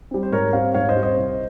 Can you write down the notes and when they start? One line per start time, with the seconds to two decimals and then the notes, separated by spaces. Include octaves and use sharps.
0.11 G3 C4
0.23 C5
0.32 G#2 A#4 C#5
0.53 G3 C4 C#5 F5
0.74 G#2 C#5 F5
0.89 C5 D#5
0.96 G3 C4
1.03 C5 D#5
1.17 C2